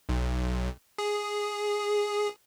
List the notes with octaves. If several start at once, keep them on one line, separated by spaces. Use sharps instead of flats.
B1
G#4